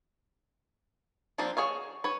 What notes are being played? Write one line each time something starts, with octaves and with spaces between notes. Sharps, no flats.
F3 A#3 C4 D4
F#4 G#4 C#5 F5
B4 C#5